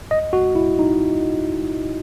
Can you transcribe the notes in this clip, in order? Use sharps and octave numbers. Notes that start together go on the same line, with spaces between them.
D#5
F#4
E4
D#4